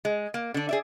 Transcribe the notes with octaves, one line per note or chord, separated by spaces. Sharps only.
G#3
A#3
D3 D4
G#4 D5 E5